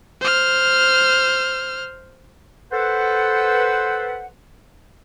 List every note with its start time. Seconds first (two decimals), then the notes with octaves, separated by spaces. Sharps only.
0.21 C5 F6
2.72 A4 B4 C5 F#5